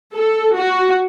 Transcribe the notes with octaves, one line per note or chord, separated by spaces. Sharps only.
A4
F#4